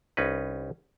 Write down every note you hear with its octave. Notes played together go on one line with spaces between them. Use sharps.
C2 C#4 D#4 B4